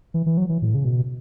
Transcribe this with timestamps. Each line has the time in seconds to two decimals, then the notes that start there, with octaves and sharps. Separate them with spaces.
0.14 E3
0.26 E3
0.37 F#3
0.49 E3
0.62 A2
0.75 C#3
0.85 B2